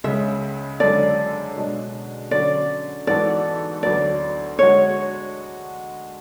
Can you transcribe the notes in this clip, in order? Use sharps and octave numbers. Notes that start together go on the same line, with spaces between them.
C#2 C#3 G#3 E5
F#2 D3 G#3 D4 A4 D5
B2 G#3 D4
D3 F#3 C#4 D5
G#2 E3 B3 F#4 A4 D5
D2 D3 F#3 B3 D5
D3 G#3 D4 F#4 C#5